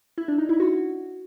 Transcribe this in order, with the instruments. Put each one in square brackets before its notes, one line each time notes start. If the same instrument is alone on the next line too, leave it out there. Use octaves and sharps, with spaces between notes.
[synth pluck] E4
D4
D#4
E4
F#4